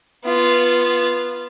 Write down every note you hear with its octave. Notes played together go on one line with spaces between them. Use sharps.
B3 F4